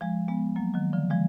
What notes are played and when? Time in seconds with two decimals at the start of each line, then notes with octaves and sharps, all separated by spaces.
0.01 F3 G#3
0.28 G#3 B3
0.56 F#3 A#3
0.74 D#3 F#3
0.93 D3 F3
1.10 F3 G#3